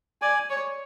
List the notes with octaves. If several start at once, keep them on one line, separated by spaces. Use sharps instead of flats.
D5 G#5
C#5